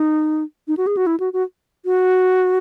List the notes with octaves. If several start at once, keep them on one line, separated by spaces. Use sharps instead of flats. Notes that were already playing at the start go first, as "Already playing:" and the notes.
Already playing: D#4
D#4
F#4
G#4
F#4
E4
F#4
F#4
F#4